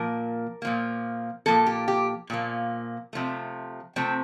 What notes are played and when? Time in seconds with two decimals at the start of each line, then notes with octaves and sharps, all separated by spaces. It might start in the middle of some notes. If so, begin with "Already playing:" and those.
Already playing: A#2 F3 A#3 A#4
0.62 A#2 F3 A#3
1.46 A#2 F3 A#3 A4
1.66 G4
1.88 G4
2.30 A#2 F3 A#3
3.13 C3 F3 A3
3.96 C3 F3 A3 C4